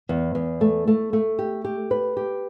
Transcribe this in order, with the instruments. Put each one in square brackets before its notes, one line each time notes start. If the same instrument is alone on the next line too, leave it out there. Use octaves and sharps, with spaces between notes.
[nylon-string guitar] E2
E2
A3
A3
A3
G4
G4
B4
G4